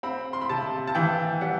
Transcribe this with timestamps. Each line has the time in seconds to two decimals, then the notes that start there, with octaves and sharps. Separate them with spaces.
0.03 C4 B5
0.33 C6
0.41 B5
0.49 C3 A5
0.87 A5
0.95 E3 G5
1.41 G3 F#5